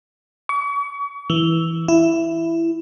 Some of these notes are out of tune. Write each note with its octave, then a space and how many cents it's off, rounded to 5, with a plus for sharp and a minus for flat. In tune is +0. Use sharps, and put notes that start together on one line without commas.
C#6 +40
E3 -5
E4 +10